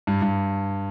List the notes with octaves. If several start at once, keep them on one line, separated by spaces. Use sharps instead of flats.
G2
G2